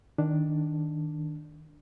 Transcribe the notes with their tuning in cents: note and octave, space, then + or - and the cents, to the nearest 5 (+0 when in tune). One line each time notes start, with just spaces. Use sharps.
D#3 +0 D4 +0